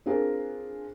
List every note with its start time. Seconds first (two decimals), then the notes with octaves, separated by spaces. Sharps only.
0.06 C4 D4 F4 G#4 A#4 C5